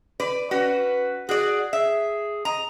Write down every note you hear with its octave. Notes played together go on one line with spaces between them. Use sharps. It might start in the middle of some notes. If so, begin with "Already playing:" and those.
B4 D5
C#4 F#4 B4
F#4 G#4 D5
G#4 E5
D#5 A#5